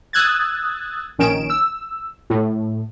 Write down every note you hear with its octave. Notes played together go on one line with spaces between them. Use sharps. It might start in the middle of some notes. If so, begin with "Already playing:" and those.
D#6 E6 F#6 G#6 A6
A#1 D#3 C#4 D7 E7
E6
A2